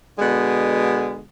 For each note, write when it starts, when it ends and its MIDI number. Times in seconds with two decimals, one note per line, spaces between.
0.19 1.23 47
0.19 1.23 50
0.19 1.23 56